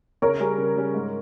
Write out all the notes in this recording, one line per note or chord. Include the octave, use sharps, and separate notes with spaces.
C#3 A#4 C#5
G3 C#4 G#4
C#3
G3 C#4 G#4
G#2